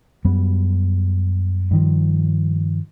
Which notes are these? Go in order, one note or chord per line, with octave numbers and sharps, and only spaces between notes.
F#2 F#3 G3 B3
G2 D#3 F3